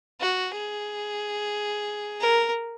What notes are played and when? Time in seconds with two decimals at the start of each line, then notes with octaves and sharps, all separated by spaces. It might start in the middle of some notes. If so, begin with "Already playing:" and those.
0.21 F#4
0.54 G#4
2.21 A#4